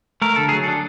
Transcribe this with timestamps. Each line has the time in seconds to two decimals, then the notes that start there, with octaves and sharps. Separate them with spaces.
0.22 A3 A#4
0.36 D3 A4
0.49 F#3 G#4
0.64 D4 A4